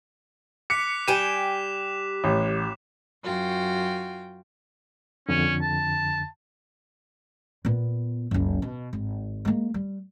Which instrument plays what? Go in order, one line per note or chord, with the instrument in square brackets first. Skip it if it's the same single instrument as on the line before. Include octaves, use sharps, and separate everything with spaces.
[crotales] D6 F#6 B6 [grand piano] C#7
[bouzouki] G3 G5 G#5 [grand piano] D#7 [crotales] E7
[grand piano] A1
[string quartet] F#2 F4 F#4 G5
[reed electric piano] F2 D3 [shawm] C#4
[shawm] A5
[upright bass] A#2 B3
F#1 C#2
B2
G#1
G#3 A#3
G3